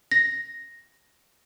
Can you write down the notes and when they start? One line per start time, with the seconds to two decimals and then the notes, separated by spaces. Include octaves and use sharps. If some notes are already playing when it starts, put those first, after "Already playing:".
0.11 A#6